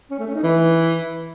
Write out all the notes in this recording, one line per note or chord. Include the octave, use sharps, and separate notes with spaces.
C#4
A3
C#4
D#4
E3